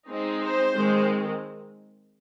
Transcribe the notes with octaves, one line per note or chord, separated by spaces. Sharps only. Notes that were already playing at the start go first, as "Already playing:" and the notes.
G#3 C4 D#4
C5
D#3 G#3 C4